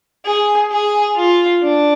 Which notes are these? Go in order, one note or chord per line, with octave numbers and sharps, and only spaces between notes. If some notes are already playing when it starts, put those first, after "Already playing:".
G#4
G#4
F4
D4